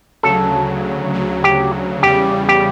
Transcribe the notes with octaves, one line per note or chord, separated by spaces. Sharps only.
D2 C#3 F#3 A4
D2 C#3 F#3
G4
E2 C#3 G3 G4
G4